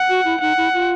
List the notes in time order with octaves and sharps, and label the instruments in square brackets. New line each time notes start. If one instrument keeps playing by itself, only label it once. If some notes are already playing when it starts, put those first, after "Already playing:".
Already playing: [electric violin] F#5
[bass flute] F#4
E4
[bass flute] D#4 [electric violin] F#5
[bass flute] E4
F4